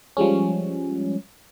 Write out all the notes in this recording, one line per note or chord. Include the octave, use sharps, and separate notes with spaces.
F3 G3 G#3 C#4